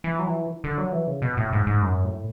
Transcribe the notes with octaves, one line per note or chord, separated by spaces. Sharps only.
E3
F#3
E3
D3
F#3
E3
C#3
B2
A2
G#2
G#2
F#2
A2